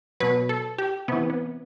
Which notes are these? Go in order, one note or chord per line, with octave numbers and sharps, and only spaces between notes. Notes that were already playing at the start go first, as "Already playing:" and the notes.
B2 F#3 B4
A4
G4
C3 E3 B3
B3